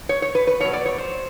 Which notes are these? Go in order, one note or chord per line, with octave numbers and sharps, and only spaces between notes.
C#5
C#5
B4
B4
B2 F#3 C#5
D5
C#5
C5